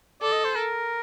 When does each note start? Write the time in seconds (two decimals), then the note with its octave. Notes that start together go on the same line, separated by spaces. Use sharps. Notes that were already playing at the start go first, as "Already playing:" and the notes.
0.22 A4 D5
0.33 D#5
0.45 C5
0.56 A#4